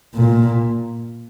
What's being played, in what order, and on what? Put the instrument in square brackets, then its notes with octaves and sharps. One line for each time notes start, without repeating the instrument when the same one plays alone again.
[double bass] A#2